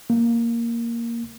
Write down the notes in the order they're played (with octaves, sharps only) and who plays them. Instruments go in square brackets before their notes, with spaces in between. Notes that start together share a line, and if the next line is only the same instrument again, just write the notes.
[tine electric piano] A#3